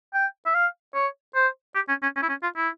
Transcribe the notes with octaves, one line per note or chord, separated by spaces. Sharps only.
G5
E5
F5
C#5
C5
G4
C#4
C#4
C#4
E4
C#4
F4
E4